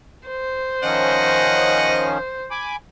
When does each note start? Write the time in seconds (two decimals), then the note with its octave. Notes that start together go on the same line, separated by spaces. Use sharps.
0.27 C5
0.83 D#3 F3 C#4 D#5 F#5
2.51 G#5 B5 D6